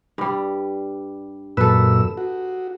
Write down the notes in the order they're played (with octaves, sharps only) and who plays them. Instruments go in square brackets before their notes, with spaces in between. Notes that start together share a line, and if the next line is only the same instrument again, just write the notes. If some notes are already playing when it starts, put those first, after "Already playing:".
[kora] G2 G3
[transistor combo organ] F#2 A#2 E6 [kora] A4 B4
[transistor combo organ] F#4